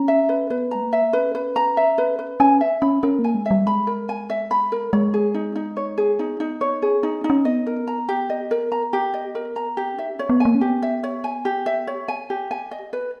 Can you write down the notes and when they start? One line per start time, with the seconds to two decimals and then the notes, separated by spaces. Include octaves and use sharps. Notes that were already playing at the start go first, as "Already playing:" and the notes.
Already playing: C#4 A#5
0.08 E5
0.29 B4
0.50 B3 B4
0.71 G#3 A#5
0.82 A#3
0.93 E5
1.13 C#4 B4
1.35 B4
1.56 A#5
1.77 E5
1.98 B4
2.19 B4
2.40 C#4 G#5
2.61 E5
2.82 C#4 B5
3.03 C#4 A#4
3.19 A#3
3.24 G#5
3.34 G#3
3.46 E5
3.51 G3
3.66 G#3 B5
3.87 A#4
4.09 G#5
4.30 E5
4.51 B5
4.72 A#4
4.93 G#3 C#5
5.14 G#4
5.34 D#4
5.55 D#4
5.77 C#5
5.98 G#4
6.19 B3 D#4
6.40 D#4
6.61 C#5
6.82 C#4 G#4
6.98 B3
7.03 D#4
7.24 D#4
7.30 C#4
7.45 B3 D#5
7.66 A#4
7.87 A#5
8.09 G4
8.30 D#5
8.51 A#4
8.72 A#5
8.93 G4
9.14 D#5
9.35 A#4
9.56 A#5
9.77 G4
9.94 C#4
9.98 D#4 E5
10.14 C#4 C#5
10.29 B3
10.40 A#3 G#5
10.55 C#4
10.61 B3 G4
10.82 E5
11.04 C#5
11.24 G#5
11.45 G4
11.66 E5
11.87 C#5
12.08 G#5
12.30 G4
12.51 G#5
12.71 D#5
12.93 B4